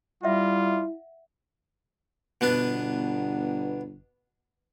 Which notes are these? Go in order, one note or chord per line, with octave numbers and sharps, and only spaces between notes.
G3 E4 F4 E5 F#5
G1 B2 B3 D4